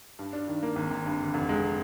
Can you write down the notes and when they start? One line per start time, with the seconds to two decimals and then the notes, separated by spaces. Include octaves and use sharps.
0.19 G2
0.33 D4
0.48 D#3
0.63 A#3
0.76 G#1
0.91 G#1
1.06 G2
1.19 D3
1.34 F1
1.49 G#3